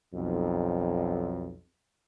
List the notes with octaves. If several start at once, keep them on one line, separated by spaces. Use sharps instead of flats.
B1 F2